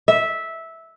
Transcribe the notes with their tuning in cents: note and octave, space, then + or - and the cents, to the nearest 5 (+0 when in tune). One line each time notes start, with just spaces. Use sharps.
E5 -10